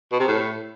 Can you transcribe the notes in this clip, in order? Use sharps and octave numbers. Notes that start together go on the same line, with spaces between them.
B2
C3
A2